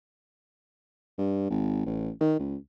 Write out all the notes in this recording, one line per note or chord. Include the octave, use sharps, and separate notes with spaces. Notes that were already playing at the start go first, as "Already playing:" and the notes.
G2
G#1
A1
D#3
C#2